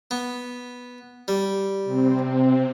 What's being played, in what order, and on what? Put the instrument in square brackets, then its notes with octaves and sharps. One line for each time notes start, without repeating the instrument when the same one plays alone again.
[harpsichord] B3
G3
[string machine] C3 C4